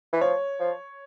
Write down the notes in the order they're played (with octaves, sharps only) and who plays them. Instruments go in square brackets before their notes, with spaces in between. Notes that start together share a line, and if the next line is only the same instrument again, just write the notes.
[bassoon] E3
[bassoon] F3 [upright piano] C#5
[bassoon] F3